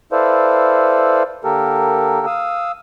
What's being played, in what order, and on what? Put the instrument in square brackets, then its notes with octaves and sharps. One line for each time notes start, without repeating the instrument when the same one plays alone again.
[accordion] E4 A4 B4 C5 D5 F5
D3 A#3 G4 A4 A#4
F5 D#6 E6